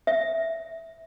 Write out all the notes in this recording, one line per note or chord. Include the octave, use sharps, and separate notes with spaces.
E5